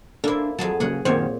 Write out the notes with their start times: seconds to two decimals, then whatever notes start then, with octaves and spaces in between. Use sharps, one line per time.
0.24 A#3 D4 E4 A4 C5
0.59 F2 F#3 G#4 A5
0.80 C#3 F#3 A#3 G#4 F#5
1.05 F#2 A#2 D#3 A#3 C4 C5 C#5